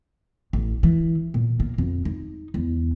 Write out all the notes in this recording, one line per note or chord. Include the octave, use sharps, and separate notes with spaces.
A1
E3
A#2
A#3
F2
D#4
E2